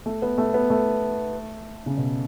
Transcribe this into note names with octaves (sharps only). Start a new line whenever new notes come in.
A3
B3
A3
B3
A3
C#3
B2